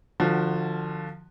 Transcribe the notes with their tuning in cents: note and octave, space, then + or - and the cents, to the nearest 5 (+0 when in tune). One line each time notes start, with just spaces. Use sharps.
D3 +30 F3 +0 F#4 +0